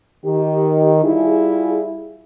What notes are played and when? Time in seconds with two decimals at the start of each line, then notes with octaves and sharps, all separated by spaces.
0.24 D#3 G4
1.03 G3 E4 F4 G#4